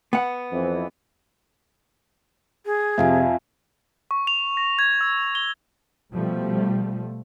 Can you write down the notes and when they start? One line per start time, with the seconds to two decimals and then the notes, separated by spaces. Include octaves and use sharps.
0.13 B3 F#5
0.52 F2 E3
2.66 G#4
2.98 F2 C3 E5 F5 G#5
4.11 C#6
4.27 F7
4.57 A#6
4.79 G#6
5.01 E6
5.35 G7
6.14 B2 F3 G3 A3